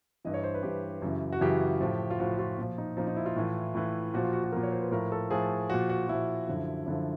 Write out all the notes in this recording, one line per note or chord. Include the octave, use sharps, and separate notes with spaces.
G2 E3 D#5
C#5
C5
B4
G2 E3 G4
F#2 C#3 E3
F#4
F#2 C#3 E3 G4
A2 F3
F4
A2 F3 F#4
F#4
F4
A#2 F3
D#4
A#2 F3 D#4
D#4
E4
F4
A2 E3
A2 E3
A#2 F3 F#4
F4
F#4
F#4
A#2 F3 A#4
C#5
C5
B4
A2 F3 A#4
A4
A2 F3 G#4
A#2 F3 F#4
F#4
A#2 F3 E4
F#2 D3 F3
F#2 D3 F3 E4